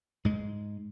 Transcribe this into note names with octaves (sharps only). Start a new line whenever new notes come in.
G#2 G#3